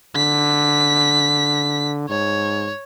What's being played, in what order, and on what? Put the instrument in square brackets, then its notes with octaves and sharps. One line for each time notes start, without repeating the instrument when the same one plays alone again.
[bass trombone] D3 [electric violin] B6
[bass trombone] G#2 [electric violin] C#5